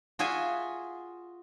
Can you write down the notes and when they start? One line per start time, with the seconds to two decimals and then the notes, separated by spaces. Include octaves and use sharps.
0.19 F4 F#4 G#4 E5 G#5